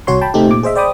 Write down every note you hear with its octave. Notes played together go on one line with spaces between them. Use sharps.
C2 F#4 C#5 C6
G5 A5 B5
C3 A3 C4 D#4 G4
A#2 D6
G#4 C5 D#5 E5
C5 D5 G5 B5 D6 D#6